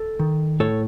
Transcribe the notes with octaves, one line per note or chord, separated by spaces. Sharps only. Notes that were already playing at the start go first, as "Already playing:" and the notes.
Already playing: A4
D#3
A2 A4 C#5